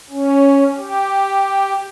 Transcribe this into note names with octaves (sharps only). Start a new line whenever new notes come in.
C#4
G4